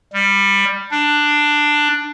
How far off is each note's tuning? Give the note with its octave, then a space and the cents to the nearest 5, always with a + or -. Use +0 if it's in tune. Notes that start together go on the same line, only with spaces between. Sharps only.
G3 +15
D4 +10